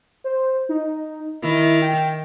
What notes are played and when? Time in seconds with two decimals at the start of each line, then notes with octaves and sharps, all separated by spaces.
0.24 C5
0.69 D#4
1.42 D#3 E4
1.82 G5